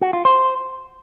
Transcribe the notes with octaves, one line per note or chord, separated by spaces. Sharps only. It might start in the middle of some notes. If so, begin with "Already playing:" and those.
F#4
F4
C5